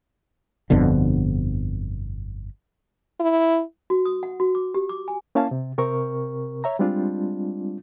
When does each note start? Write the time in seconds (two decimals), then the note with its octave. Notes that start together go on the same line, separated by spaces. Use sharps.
0.70 G1 F2 B2 D3
3.20 E4
3.90 F#4
4.05 D#6
4.23 F#5
4.40 F#4
4.55 D6
4.74 G4
4.89 D6
5.08 G#5
5.35 A#3 C#4 E4 F5 A5
5.51 C3
5.78 C3 C4 A#4 C#6
6.64 C#5 E5 A#5
6.79 G3 G#3 C4 D4 F4